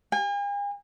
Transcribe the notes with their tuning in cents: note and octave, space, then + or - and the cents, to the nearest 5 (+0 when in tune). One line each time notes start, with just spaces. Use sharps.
G#5 -45